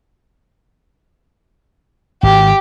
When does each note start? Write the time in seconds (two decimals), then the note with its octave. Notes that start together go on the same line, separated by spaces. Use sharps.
2.23 G#1 G4